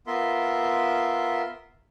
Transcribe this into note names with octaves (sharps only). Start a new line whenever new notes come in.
B3 F4 A#4 E5 C6